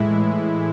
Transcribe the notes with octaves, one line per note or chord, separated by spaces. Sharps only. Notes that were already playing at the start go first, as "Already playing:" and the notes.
Already playing: A2 E3 G#3 E4